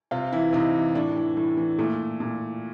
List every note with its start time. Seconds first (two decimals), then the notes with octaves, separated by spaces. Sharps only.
0.11 C3 F4
0.32 E3 E4
0.53 C3 D#4
0.74 E3
0.95 A2 D4
1.16 E3
1.37 A2
1.57 E3
1.79 A#2 A3
2.20 A#2